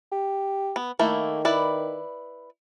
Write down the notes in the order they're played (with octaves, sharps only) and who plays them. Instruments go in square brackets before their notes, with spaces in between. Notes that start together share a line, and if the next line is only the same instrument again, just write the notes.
[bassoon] G4
[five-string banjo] B3
[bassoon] D#3 [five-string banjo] A3 A#3 E4
[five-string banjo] E4 B4 D5